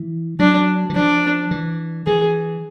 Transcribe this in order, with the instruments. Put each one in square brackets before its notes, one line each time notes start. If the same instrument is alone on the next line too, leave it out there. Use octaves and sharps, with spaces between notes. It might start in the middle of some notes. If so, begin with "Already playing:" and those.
Already playing: [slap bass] E3
[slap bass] F#3 [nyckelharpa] D4
[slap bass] E3
[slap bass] F3 [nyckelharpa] D4
[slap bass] E3
[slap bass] E3 [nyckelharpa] G#4